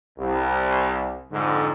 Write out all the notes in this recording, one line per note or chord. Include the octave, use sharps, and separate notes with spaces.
C2
F2 G#2 D3